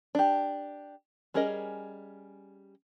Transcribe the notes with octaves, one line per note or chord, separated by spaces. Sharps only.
D4 G4
G3 C#4 G#4 A#4 D#5